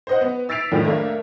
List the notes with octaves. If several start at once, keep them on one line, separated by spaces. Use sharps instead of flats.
C5 D#5 F#5
B3
E6 A6 B6 C7 D7 F7
F2 A2 D#3 D4
A3 A#3 D4